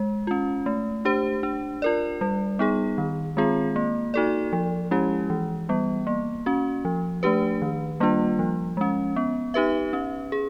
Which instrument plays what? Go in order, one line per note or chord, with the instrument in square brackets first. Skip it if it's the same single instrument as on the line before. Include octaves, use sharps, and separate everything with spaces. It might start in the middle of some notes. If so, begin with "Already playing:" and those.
Already playing: [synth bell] G#3
C#4 F4
A3
D4 G4 C5
D4
F4 A#4 D5
G3
B3 D#4 G#4
D#3
G#3 C4 F4 G#4
A#3
D#4 F#4 A4 D5
F3
G#3 C#4 E4 G4
E3
G3 B3
A#3
C#4 F#4
F3
A3 D4 G4 B4
D#3
G3 A#3 D4 F4
F3
G#3 C#4
B3
D#4 G4 B4 E5
C#4
G#4